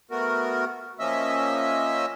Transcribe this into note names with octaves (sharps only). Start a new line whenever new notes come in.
A3 B3 F#4 A#4
F3 A#3 C#4 D#5 E5 E6